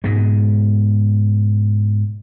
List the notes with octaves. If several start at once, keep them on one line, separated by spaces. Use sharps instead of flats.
G#2 B2 G#3